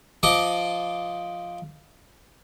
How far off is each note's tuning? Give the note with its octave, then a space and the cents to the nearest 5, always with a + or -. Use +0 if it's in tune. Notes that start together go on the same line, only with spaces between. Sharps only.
F3 +0 D#5 +5 D6 +0